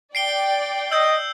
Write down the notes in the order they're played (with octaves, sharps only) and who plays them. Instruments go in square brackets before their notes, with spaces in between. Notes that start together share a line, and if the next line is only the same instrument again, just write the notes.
[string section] D5 G5 [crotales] C7 D7 G7
[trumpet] D#5 [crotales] E6 G6